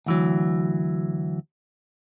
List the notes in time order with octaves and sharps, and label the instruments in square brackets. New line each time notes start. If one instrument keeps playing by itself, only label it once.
[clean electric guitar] D2 E3 F#3